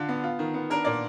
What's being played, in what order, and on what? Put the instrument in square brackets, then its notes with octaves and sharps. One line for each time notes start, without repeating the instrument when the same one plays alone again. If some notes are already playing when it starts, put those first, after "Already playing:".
Already playing: [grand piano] D3 F4
B3
F4
D#3
B3
D4 A#4
A#2 D5